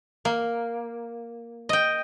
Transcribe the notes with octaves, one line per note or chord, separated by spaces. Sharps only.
A#3
D#5 G5